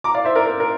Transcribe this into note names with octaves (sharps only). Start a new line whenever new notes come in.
A#5 D6
D5 F5
C5 E5
A#4 D5
A#4
A#4